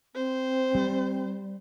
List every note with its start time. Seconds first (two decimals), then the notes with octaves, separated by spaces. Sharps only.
0.15 C4 C5
0.75 G3